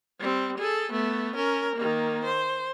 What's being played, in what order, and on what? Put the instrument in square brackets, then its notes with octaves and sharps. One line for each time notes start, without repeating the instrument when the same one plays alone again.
[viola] G3 C4
G#4 A4
A3 B3
C#4 A#4
D#3 A#3
C5